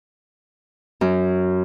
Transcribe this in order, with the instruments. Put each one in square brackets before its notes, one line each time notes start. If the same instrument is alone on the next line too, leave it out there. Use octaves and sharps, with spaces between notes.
[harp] F#2